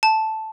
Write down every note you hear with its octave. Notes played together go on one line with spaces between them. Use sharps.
A5